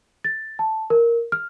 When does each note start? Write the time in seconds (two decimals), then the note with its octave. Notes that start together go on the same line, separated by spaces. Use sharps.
0.24 A6
0.59 A5
0.90 A#4
1.32 F6